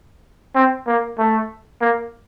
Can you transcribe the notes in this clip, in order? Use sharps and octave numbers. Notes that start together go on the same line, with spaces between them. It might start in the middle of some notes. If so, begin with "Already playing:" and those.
C4
A#3
A3
A#3